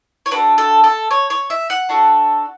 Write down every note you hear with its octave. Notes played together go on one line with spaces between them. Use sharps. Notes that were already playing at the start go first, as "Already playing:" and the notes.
C#5
D4 F#4 A4 B4
A4
A4
C#5
C#5
E5
F#5
D4 F#4 A4